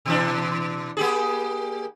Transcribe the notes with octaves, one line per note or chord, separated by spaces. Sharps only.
B2 E3 D4
A#3 G4 G#4